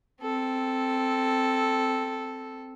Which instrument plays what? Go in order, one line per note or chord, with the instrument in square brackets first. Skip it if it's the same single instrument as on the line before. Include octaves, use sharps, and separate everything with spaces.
[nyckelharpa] C4 A4